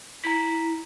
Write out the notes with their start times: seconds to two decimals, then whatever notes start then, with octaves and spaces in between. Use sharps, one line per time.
0.24 E4 A#5 B6